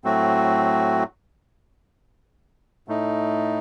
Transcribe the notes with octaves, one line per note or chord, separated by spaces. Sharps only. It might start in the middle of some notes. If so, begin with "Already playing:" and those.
A2 F#3 A3 C4 F#4
A2 A3 D#4